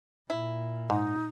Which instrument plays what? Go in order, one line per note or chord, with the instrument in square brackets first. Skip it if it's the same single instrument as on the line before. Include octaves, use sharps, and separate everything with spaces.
[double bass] A#2 [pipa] E4
[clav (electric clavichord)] G#2 [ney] D#4